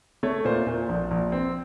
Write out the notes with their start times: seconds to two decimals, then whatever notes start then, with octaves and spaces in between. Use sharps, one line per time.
0.23 A3 C#5
0.45 A#2 C5
0.67 A#2
0.89 A#1
1.11 A#1
1.32 C4